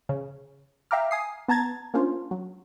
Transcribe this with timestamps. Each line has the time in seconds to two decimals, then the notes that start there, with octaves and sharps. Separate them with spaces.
0.09 C#3
0.91 E5 F5 G5 A#5 D6 F6
1.11 G#5 D#6 C7
1.48 B3 A5 A#5 G#6 A6
1.94 A#3 C#4 D4 F4 C5
2.31 F#3